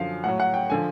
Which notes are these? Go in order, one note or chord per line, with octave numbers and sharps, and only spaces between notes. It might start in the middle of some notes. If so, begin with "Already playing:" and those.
Already playing: F#2 D3 F3 F5
A2 F#3 F#5
F#5
G5
D3 F3 G#5